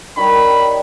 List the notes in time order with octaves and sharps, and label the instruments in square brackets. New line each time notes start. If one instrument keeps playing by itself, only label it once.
[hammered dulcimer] D#3 G3 C#5 [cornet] B5